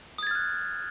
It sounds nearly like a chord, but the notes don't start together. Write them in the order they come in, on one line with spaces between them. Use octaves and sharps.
D#6 G#6 A6 F6 F#6